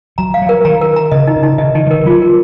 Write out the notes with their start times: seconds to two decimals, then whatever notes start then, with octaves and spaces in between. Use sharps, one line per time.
0.18 F#3 A#5
0.34 F5
0.42 F#3
0.49 A#4
0.65 D#3 A#5
0.81 A#4
0.96 A#5
1.12 C#3 D#5
1.27 D#4
1.36 C#3
1.43 D#4
1.58 C#3 D#5
1.75 D#3 D#4
1.86 F3
1.90 D#3 A#4
2.05 F#3 F4
2.22 A#4